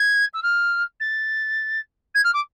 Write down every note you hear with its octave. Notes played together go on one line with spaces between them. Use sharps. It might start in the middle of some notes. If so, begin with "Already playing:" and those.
Already playing: G#6
E6
F6
A6
G#6
F6
D6